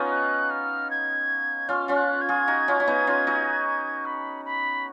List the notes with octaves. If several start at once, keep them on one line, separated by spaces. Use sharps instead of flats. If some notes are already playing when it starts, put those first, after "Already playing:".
Already playing: B3 C#4 D#4 F4
F#6
F6
G#6
C#4 F4 F6
C#4 F4 F6
F#6
G#6
F4 G#4
D#4 F#4
C#4 F4
C#4
B3 D#4
C#4 F4
D#4 F#4
B5
B5